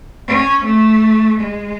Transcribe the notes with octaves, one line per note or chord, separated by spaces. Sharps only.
C#4
A3
G#3